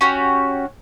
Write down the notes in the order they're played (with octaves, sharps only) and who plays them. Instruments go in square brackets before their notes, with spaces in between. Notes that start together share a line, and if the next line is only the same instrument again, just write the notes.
[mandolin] C#4 F#4 G4